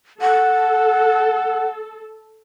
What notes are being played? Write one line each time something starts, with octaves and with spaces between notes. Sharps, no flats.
A4 F#5